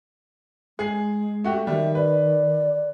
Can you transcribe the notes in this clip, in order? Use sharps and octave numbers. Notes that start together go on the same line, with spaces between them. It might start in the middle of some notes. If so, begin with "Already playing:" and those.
G#3 G#4 C7
A3 F#4 G4
D#3 G3 E5
B4 D5